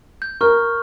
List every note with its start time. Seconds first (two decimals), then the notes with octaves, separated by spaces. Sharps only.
0.22 G6
0.41 A#4 C#6 F6